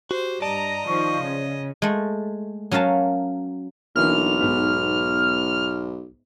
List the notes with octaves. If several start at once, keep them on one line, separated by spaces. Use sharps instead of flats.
F#4 G4 C5
G2 D5 D#5 A5 A#5
D#3 F3 C#6
C#3 C#5
G#3 A3
F#3 C#4 A#4 F5 A5
B1 D3 E3 A#3 F6
G#2 B3